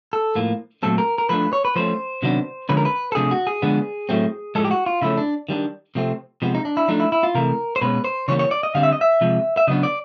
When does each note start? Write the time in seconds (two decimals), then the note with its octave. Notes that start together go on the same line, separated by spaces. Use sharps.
0.13 A4
0.35 A2 F3 A#3
0.83 A#2 F#3 A3 C4 A4
0.98 A#4
1.18 A#4
1.29 F3 A3 D4 B4
1.53 C#5
1.65 B4
1.76 F3 A3 C#4 C5
2.22 C3 D#3 F#3 B3 D4
2.69 D3 F3 G#3 C#4 B4
2.77 A#4
2.85 B4
3.12 A4
3.15 C3 F3 A3 D4 G#4
3.31 F#4
3.47 G#4
3.62 D3 F3 G#3 B3 D4
4.09 A2 F#3 A3 C4
4.55 A2 F3 G#3 A4
4.65 G4
4.71 F#4
4.86 F4
5.02 C#3 F3 A3 C#4 E4
5.17 D4
5.49 D#3 G3 B3 D4
5.95 C3 F3 A3 C4
6.42 C3 F3 G#3 B3
6.55 D#4
6.65 D4
6.77 E4
6.88 F3 A3 D4 D#4
7.00 E4
7.12 E4
7.23 F4
7.35 C3 E3 A3 A#4
7.76 C5
7.81 B2 G#3 C#4 B4
8.04 C5
8.28 C#3 E3 G3 A#3 C#5
8.39 C#5
8.51 D5
8.63 D#5
8.75 D3 G3 C4 F5
8.83 E5
8.92 D#5
9.01 E5
9.21 C3 F3 G#3
9.57 E5
9.67 C#3 F#3 B3 D4 D#5
9.83 D5